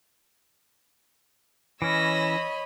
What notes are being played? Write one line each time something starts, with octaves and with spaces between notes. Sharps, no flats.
E3 C#4 C#5 D#5 B5 E6 A#6